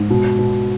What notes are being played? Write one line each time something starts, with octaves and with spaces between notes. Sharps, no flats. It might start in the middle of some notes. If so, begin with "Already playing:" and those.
Already playing: G#2
B2
B2